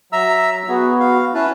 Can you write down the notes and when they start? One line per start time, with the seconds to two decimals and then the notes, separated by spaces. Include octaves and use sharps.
0.12 F#3 E5 A#5 E6
0.69 B3 F#4 G#4
1.00 F5
1.34 C#4 E4 B4 A5